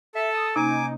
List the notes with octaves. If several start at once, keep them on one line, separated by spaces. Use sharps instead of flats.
A4 E5 A5
D#6
C3 A#3 C#4 D#4 G#5 D6